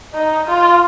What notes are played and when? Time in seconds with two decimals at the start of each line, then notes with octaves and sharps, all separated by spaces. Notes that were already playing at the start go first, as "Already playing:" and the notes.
0.14 D#4
0.48 F4